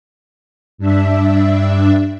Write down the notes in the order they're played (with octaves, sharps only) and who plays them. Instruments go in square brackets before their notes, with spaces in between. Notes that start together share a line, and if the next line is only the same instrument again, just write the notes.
[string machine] G2 D4 E5